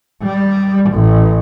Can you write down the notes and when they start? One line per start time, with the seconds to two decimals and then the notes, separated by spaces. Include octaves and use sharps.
0.23 G3
0.90 A1